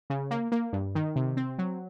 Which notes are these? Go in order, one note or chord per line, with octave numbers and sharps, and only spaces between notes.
C#3
A#3
A#3
G2
D#3
C3
C4
F#3